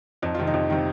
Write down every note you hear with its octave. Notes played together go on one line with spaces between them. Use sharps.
F2 D#4
C3 D#3 F4
D#3 D#4
F2
C3 D#3